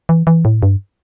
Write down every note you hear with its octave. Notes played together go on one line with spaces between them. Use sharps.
E3
E3
A2
G2